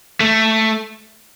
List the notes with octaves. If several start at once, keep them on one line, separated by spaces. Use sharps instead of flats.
A3